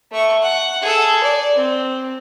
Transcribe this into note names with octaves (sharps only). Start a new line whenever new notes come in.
A3 C#6
F#5
G#4 A4
D5
C4